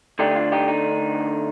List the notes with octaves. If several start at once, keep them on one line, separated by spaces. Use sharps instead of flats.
D3 A3 D4 D#4 G4
D#4
F4
D#4 G4
D#4